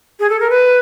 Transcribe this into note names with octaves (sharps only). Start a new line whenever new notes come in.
G#4
A4
A#4
B4